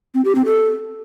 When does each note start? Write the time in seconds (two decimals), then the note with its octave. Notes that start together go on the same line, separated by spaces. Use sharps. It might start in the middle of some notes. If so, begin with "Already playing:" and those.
0.14 C4
0.25 G4
0.35 C4
0.46 A4